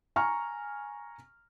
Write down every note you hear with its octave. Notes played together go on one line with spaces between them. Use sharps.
G#5 A#5 C#6 F6